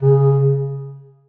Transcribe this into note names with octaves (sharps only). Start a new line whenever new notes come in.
C#3